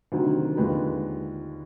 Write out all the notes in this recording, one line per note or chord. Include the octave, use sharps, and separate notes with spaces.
D2 C3 D#3 F#3
D#2 D3 F3 G#3 B4